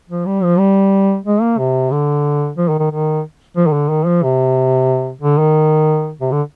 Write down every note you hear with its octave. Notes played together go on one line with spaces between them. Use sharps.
F3
G3
F3
G3
G#3
A#3
C3
D3
F3
D#3
D#3
D#3
F3
D#3
D3
D#3
F3
C3
D3
D#3
C3
D3